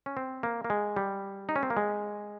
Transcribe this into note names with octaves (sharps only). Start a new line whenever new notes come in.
C#4
C4
A#3
A#3
G#3
G3
D#4
C#4
C4
A#3
G#3